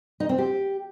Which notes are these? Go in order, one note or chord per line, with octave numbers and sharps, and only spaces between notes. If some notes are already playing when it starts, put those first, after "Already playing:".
D#4
C4
G4